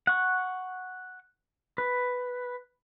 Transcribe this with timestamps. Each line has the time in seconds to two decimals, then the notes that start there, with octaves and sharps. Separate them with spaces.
0.07 F#5 C#6
1.78 B4